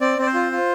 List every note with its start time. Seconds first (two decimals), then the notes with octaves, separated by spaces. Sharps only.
0.01 C4 D5
0.18 C4 D5
0.26 C5
0.34 F4
0.52 F4